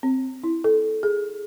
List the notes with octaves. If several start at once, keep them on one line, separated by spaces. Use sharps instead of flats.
C4
E4
A4
G#4